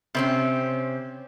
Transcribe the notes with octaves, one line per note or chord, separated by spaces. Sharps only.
C3 C4 C#4